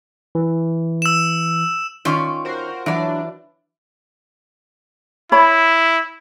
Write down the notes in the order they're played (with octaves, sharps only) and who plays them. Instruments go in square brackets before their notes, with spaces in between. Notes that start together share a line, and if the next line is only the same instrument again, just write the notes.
[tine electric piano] E3
[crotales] E6 E7
[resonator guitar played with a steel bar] D#3 C#4 D5 [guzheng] F4
[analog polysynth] F#4 A#4 C5
[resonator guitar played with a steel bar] E3 D5 [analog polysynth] F#3 D4
[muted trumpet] E4 [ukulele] C#5 B5